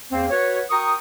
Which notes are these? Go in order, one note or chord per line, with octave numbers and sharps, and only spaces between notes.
E2 A#3 C4
F#4 B4 C#5
F#4 A#4 G5 A#5 C#6 D#6